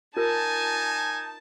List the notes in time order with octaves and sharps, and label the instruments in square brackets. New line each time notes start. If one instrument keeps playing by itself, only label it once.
[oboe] D#4 [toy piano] F4 A#4 [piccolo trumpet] G#5 [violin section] A5